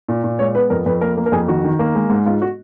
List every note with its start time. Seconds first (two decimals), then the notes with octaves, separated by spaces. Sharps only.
0.08 A#2
0.24 A#2
0.39 G#3 C#5
0.55 B3 B4
0.70 F2 A#4
0.86 F2 B4
1.01 A#3 A#4
1.17 A#3
1.26 A#4
1.32 F2 G#4
1.48 D#3 F#4
1.64 D#3
1.79 A#3
1.95 G#3
2.10 G#2
2.26 G#2 F4
2.42 F#4